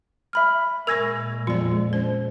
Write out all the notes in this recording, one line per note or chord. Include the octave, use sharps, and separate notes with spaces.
E5 B5 F6
A#2 G#3 A#4 G#5 C#6 E6 G#6 A#6
F2 F4 D5
C#4 C5